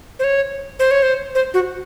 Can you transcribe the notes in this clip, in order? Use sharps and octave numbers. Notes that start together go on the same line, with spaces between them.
C5
C#5
C5
C#5
C5
C5
F#4